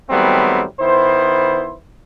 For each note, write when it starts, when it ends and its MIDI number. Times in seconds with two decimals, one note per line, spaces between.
0.10 0.64 51
0.10 0.64 54
0.10 0.64 55
0.10 0.64 57
0.10 0.64 59
0.10 0.64 60
0.80 1.75 51
0.80 1.75 59
0.80 1.75 64
0.80 1.75 72